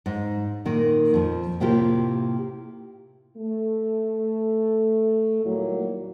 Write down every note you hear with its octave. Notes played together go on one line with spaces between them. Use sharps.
G#2
A#2 D#3 A#3
F2 F3
A2 C3 A#3 E4 F4 G4
A3
D#2 A#2 F#3 G3 A#3 E4